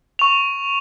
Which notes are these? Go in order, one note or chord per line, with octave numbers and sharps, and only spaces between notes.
C#6 F7